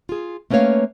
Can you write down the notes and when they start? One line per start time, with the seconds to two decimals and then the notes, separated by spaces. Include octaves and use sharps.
0.09 F4 G#4
0.50 A3 A#3 C#4 B4 C#5 F5